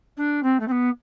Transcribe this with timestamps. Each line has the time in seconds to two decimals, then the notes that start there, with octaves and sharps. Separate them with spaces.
0.17 D4
0.42 C4
0.59 A3
0.67 C4
0.71 B3